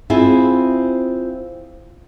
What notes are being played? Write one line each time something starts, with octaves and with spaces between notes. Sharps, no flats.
C4 E4 F4 G#4